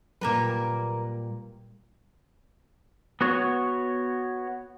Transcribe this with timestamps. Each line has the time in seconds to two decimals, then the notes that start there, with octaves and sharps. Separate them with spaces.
0.21 A#2 G3 A#3 A#4 B4
3.21 B3 F#4 C#5